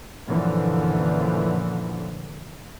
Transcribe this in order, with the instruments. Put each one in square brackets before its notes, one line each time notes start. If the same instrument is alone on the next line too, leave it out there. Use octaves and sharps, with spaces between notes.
[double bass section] F#2 A#2 D3 E3 F3